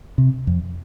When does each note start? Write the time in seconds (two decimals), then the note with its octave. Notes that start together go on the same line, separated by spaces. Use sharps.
0.18 C3
0.47 F2